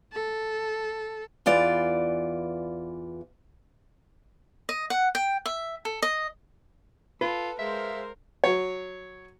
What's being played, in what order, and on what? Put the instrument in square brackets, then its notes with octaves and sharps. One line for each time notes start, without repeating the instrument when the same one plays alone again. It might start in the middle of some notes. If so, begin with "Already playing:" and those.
[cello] A4
[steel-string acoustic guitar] E2 E3 F4 D5
[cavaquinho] D#5
F#5
G5
E5
A4
D#5
[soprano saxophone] F4 [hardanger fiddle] A4 [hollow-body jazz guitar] B4
[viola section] G#3 C5 F5 [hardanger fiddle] A#4 [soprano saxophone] E5
[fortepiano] F#3 C#5